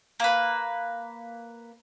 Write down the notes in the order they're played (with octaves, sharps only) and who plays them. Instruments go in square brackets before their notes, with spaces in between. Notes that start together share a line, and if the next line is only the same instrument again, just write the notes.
[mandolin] A#3 B4